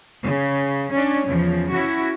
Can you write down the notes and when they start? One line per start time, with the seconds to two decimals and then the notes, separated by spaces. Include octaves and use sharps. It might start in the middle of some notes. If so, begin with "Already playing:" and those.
0.24 C#3
0.91 C#4 D4
1.26 E2 C#3 F3
1.73 C#4 E4 F#4